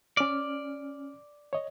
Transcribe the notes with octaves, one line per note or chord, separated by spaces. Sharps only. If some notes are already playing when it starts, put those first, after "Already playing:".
C#4 D5 F6
C#5 D#5